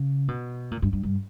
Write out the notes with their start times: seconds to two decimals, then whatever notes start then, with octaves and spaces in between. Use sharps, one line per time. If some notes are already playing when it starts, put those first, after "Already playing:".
Already playing: C#3
0.28 B2
0.71 A#2
0.82 G2
0.93 G2
1.03 G2